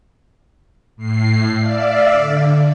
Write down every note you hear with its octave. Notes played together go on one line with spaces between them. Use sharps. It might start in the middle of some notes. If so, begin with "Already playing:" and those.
A2 C7
D5 E5 F5
D3